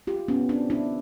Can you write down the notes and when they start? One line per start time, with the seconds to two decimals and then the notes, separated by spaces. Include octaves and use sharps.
0.07 F4 G4
0.28 B3 C#4
0.49 C4 D4
0.70 D4 E4